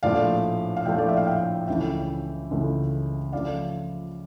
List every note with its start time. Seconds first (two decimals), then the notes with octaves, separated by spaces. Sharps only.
0.03 A#1 A2 F3 A3 D5 F5
0.76 F5
0.85 A#1 A2 F3 A3 E5 G5
0.98 D5
1.08 E5
1.17 F5
1.27 E5 G5
1.67 C#2 C#3 E3 A3 E5 G5
2.51 C#2 C#3 E3 A3
3.32 C#3 F3 A3 D5 F5